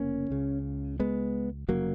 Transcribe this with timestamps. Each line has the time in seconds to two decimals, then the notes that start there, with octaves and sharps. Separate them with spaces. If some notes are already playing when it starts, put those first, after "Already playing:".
Already playing: F1 C#3 A#3 C#4
0.30 C#2 C#3
1.00 G#3 B3
1.68 F1 C#3 F#3 A#3